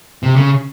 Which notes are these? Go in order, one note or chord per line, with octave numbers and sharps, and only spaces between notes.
C3
C#3